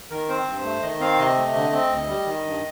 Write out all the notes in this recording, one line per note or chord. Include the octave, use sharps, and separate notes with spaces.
D#3 A#4
C4 C5
G2
A3
D#3 D#5
C4 F5
C3 D#5
A3
D3
C4
D2
G3
D#3
G2